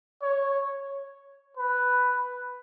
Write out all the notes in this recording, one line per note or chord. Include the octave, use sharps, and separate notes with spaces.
C#5
B4